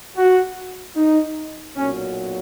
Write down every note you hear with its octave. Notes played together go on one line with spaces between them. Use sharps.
F#4
D#4
B1 A#2 F#3 C#4